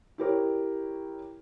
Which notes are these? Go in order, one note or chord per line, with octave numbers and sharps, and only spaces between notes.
E4 G4 A#4 C#5